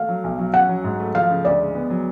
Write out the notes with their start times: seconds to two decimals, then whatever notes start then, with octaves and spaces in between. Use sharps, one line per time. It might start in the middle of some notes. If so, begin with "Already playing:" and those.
Already playing: A3 F5
0.09 F#3
0.24 B1
0.39 F#3
0.54 C#4 F#5
0.69 F#3
0.84 G#2
1.00 A3
1.15 F3 F5
1.30 C#3
1.45 D2 D5
1.60 G#3
1.75 B3
1.90 F#3